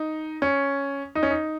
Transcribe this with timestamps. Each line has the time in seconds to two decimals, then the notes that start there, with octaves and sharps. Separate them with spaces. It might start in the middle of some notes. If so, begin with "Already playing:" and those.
Already playing: D#4
0.42 C#4
1.15 D#4
1.23 C#4
1.31 D#4